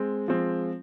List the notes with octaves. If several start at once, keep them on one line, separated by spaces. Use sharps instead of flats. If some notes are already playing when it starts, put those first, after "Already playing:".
Already playing: G#3 C4
F3 G#3 C4